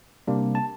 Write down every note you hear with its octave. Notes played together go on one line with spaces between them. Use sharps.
C3 G3 A#3 D4
A5